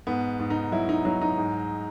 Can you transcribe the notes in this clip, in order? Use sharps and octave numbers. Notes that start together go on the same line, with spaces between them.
G#2 B3
G#2
D#4
F#3 E4
D#4
F#3 D#4
D#4
G#2